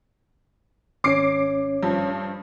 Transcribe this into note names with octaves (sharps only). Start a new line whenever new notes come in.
G#1 C#4 C#5 D6 C7 D7
G2 F3